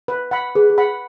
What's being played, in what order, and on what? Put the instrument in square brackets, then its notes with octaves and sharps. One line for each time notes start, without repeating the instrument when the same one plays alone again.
[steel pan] B4
F#5 B5
[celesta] G#4 [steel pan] B4
[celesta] G#4
[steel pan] F#5 B5